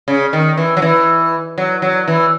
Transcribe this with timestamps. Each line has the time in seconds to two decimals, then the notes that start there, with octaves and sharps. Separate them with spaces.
0.08 C#3
0.33 D#3
0.57 E3
0.77 F#3
0.82 E3
1.58 F#3
1.82 F#3
2.08 E3